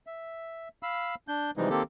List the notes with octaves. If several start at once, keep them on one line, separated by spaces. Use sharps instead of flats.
E5
F5 B5 E6
D4 G6
C3 E3 F3 G3 G#3 D#4
D#3 A#3 C4 G4 A4